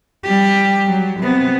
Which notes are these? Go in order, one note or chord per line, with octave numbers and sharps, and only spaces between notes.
G3 G4
F#3
C3 B3